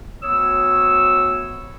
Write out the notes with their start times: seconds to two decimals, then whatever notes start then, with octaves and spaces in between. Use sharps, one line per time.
0.23 D2 B3 C#5 D#6 E6